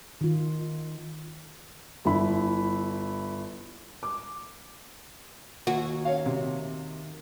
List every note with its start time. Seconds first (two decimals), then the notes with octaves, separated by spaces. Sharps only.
0.21 D#3 F4
2.05 G1 E4 B5
4.03 D6
5.67 D#2 F#4
6.05 C#5 F5
6.26 C3